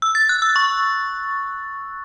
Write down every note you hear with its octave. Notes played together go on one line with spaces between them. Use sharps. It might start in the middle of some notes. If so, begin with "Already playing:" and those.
E6
A6
F#6
E6
C#6